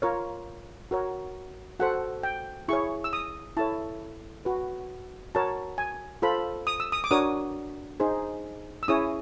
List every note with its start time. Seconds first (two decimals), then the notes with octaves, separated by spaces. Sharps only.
0.02 F4 A#4 C#5
0.91 F#4 A#4 C#5
1.80 F#4 A4 C5 F#5
2.23 G5
2.68 E4 G#4 C#5 C#6
3.04 E6
3.13 D#6
3.57 E4 A4 C#5 A5
4.45 F#4 B4
5.35 F#4 A#4 C#5 A5
5.78 G#5
6.22 F4 A4 C5 B5
6.67 D#6
6.80 E6
6.92 D#6
7.04 D6
7.11 D4 F#4 A#4 C#5 D#6
8.00 D#4 G#4 C5
8.83 E6
8.88 C#4 E4 G#4 C#5 D#6